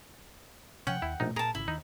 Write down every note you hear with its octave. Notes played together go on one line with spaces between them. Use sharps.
C3 F3 C#4 F#5 G5
D#2 E4
A#1 B2 A3 D#4
A#2 G#4 A#4 A5 A#5
G#1 C#3 E4
D#2 D#3 D#4